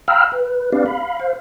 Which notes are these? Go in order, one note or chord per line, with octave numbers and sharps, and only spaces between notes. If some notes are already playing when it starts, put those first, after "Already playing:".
F5 G5 A#5 B5 E6 F6
B4
C4 D4 G4 B4 D5 F5
F5 B5
C5 F5